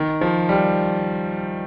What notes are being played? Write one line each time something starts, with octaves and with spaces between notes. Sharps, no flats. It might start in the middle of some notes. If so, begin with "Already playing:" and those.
Already playing: D#3
F3
G3